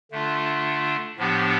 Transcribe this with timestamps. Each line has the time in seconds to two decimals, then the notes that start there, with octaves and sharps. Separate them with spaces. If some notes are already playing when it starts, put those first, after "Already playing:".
0.11 D3 A3 D4 F4
1.17 A2 F3 B3 D4 G4